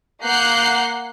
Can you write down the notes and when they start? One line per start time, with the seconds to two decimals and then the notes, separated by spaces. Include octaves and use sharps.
0.24 A#3 F#5 F#6 G6 C7